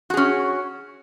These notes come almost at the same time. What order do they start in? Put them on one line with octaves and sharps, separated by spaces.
F#4 G#4 C#4